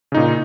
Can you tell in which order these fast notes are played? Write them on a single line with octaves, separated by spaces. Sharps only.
C#3 D#4 A#2